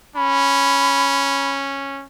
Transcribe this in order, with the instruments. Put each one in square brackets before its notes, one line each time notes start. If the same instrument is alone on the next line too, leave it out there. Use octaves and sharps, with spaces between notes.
[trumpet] C#4 [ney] B5